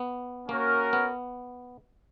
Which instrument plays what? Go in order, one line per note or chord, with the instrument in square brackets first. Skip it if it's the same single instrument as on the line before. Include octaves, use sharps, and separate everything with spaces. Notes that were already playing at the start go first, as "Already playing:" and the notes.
Already playing: [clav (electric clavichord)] B3
[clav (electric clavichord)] A#3 [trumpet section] C#4 F#4 A#4 C#5
[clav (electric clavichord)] B3